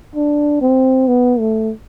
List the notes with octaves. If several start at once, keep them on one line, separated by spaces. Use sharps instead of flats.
D4
C4
B3
A3